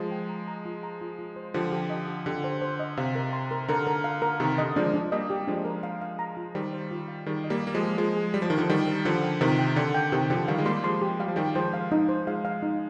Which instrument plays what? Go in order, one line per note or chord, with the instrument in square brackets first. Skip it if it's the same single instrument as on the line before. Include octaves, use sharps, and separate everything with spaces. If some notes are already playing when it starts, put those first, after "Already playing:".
Already playing: [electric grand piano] F3 G#3 [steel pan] F5
[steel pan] G5
A#5
A#5
F4
A#5
F4
F4
C5
[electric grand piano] D3 F3 [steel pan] G4
[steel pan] G4
D#5
G4
[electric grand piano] D3 [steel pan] G4
[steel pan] C5
C5
D#5
[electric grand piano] C3 [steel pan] F5
[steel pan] A#4
C6
A#4
[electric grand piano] D3 [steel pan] A#4
[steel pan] A#4
F5
A#4
[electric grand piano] C3 D#3 [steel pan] A#4
[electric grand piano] D3 [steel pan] D#5
[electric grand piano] F3 G#3 [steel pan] D4
[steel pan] D4
[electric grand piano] G3 A#3 [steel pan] D#5
[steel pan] G4
[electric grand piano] F3 G#3 [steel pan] D4
[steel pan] A#4
F5
F5
A#5
F4
[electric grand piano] D#3 G3 [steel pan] C5
[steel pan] C5
F4
F5
[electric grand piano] D#3 G3 [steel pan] G#4
[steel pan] D#5
[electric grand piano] G3 A#3
[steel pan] D#5
[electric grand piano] A#3
F3 G#3
[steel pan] G#4
[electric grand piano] F3 G#3 [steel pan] G#4
[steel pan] G#4
[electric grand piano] G3 [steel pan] G#4
[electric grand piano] F3
[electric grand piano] D#3 [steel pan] A#5
[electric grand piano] D3 F3
[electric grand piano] D#3 G3 [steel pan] D5
[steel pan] A#4
[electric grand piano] D3 F3 [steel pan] A#4
[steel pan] G5
[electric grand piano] C3 D#3 [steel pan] A#4
[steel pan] G5
[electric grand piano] D3 [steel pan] D5
[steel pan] G5
[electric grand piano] C3 D#3 [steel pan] G4
[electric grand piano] D3 F3 [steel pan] G4
[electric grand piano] D#3 G3 [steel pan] F5
[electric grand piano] G#3
[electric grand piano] G3 A#3 [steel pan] C6
[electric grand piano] F3 G#3 [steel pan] C6
[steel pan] G4
[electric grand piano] G3 [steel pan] F5
[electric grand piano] F3
[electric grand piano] D#3 G3 [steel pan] G4
[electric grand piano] F3 G#3 [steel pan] C5
[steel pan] F5
D#4
C5
[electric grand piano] F3 G#3 [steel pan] F5
[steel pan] F5
D#4